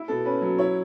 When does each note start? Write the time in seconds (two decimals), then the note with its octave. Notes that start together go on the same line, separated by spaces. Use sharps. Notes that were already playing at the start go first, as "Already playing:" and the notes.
Already playing: E4
0.08 B2 A4
0.25 C#4 B4
0.42 F#3
0.58 E4 C#5